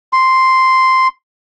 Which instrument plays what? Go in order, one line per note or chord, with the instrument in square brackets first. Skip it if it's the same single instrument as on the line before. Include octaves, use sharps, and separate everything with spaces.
[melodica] C6